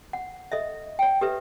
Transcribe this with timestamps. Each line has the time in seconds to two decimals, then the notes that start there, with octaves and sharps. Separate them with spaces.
0.13 F#5
0.52 A4 D#5 E5
0.99 C#5 G5
1.21 G4 A4 B4 E5